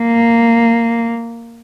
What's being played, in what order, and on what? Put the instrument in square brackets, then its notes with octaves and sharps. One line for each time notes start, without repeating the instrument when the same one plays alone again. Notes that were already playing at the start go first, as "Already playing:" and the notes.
Already playing: [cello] A#3